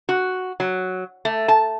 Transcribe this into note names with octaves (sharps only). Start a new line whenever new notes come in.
F#4
F#3
A3
A5